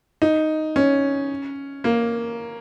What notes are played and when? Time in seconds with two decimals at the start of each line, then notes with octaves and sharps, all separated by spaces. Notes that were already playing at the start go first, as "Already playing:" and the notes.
0.22 D#4
0.76 C#4
1.84 A#3